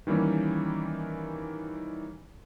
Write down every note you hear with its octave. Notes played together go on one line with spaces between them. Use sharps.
D#3 E3 G3 A#3 C#4